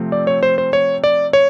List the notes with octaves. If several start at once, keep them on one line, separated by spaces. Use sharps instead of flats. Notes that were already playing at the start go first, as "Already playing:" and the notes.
Already playing: C3 F3 A3 C4
D5
C#5
C5
C5
C#5
D5
C#5